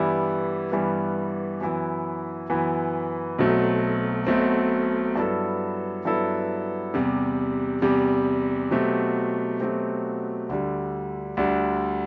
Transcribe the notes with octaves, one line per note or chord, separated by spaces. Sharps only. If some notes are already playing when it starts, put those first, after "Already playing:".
Already playing: G2 E3 G3 B3 E4
G2 E3 G3 B3 E4
F#2 E3 B3 E4
F#2 E3 B3 E4
B1 B2 F#3 A3 C4
B1 B2 F#3 A3 C4
G2 F#3 B3 E4 A4
G2 F#3 B3 E4 A4
E2 C3 G3
E2 C3 G3
B2 F#3 A3 C4 G4
B2 F#3 A3 C4 G4
D2 D3 G3
D2 D3 G3